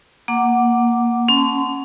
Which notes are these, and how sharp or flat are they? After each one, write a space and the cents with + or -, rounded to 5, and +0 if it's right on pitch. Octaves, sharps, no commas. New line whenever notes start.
A#3 +0 F#5 +0 D6 +0
C#4 -10 A5 -15 C6 -35